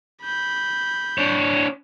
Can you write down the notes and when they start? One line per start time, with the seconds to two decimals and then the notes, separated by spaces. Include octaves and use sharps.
0.23 B5 G6
1.18 D4 C#5